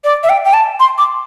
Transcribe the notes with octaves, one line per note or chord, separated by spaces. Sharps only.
D5
E5
G5
G5
A5
C6
D6